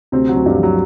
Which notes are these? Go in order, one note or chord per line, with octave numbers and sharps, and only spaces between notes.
D2 C3 C4
F#3
D2
G2 G3
F3
F#3